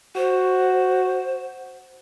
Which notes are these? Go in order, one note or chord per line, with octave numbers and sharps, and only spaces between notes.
F#4 C5